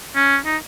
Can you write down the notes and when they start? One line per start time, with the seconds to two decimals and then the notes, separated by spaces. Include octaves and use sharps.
0.16 C#4
0.46 D#4